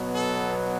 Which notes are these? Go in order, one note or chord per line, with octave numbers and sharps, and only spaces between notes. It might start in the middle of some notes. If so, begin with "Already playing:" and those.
Already playing: B2 F#3 B3
A4